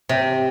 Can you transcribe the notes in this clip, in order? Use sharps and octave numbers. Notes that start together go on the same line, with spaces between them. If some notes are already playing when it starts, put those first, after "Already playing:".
C3